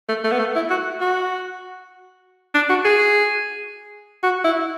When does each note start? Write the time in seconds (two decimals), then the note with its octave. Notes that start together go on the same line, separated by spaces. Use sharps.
0.08 A3
0.24 A3
0.32 B3
0.39 A3
0.55 E4
0.70 F#4
1.01 F#4
2.54 D4
2.69 F#4
2.85 G#4
4.23 F#4
4.44 E4